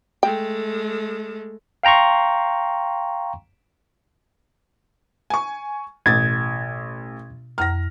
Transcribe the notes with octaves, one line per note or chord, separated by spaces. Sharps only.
G#3 A3 G5
F5 G5 A#5 C6 C#6
G#5 C#6
A1 B2 G#6 A6
F2 A#5 F6 A#6